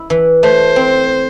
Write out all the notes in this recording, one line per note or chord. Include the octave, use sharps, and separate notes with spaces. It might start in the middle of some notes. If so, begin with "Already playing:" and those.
Already playing: E4
E3
A3 C5
C4